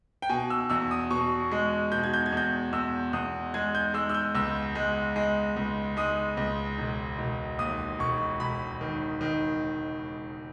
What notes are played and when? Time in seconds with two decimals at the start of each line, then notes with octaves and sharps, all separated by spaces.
0.22 G5
0.30 B2 G#5
0.50 E6
0.70 E2 E6
0.91 D#6
1.11 B2 C#6
1.52 G#3
1.92 B2 G6
2.04 G#6
2.14 G6
2.26 G#6
2.32 E2 G6
2.73 E2 E6
3.13 E2 D#6
3.54 G#3 G#6
3.75 G6
3.94 G#3 E6
4.09 E6
4.14 G6
4.35 C#2 E6
4.75 G#3
5.16 G#3
5.56 C#2
5.97 G#3 D#6
6.37 C#2
6.78 E1
7.19 E1
7.59 D#2 D#6
7.99 E1 C#6
8.40 E1 B5
8.81 D#3
9.21 D#3